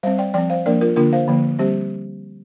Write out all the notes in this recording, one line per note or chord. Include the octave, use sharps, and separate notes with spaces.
G3 C4 C5 F5
D5 G5
F3 C4 D5 G5
C5 F5
F3 A#3 D4 A#4 D5
F4 A#4
D3 A#3 D4 F4 A#4
C5 F5
D3 F3 A#3
G3 C4 G4 C5